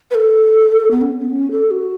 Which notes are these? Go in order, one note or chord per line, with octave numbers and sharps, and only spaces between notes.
B4
A4
B3
C#4
B3
C#4
A4
F#4